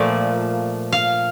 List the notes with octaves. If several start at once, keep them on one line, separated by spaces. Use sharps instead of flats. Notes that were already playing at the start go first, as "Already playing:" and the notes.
Already playing: A#2 F3 A3 D5
F5